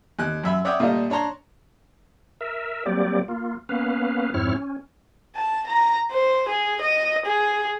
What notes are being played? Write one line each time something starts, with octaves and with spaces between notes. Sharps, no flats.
D#2 F#6
F#2 E5 B5
C#5 D5 E5 F#5 G5 D#6
A#2 G3 A3 F4 D#5
D4 C#5 A5 A#5 C6
A#4 E5
F#3 G3 A#3 C4 G4 D5
A#3 F4
A#3 B3 C#4 B4 F5
F2 G#2 C4 E4 C#5 F6
C#4
A5
A#5
C5
G#4
D#5
G#4